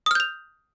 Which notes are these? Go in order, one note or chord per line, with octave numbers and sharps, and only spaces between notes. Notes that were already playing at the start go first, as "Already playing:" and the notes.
D#6 F6 G6 F7